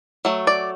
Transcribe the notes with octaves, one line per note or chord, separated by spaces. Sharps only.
F#3 A3
D5